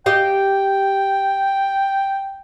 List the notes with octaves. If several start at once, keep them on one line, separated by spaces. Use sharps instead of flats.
G4 D#5 F5 G5